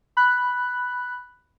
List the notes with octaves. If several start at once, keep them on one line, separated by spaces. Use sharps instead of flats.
B5 F#6